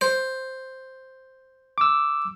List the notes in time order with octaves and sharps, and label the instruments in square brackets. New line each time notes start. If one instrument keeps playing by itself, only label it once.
[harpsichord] C5
[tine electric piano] D6 E6